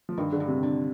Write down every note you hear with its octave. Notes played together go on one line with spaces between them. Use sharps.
F3
G2 D#3
D3
G2
C3
D3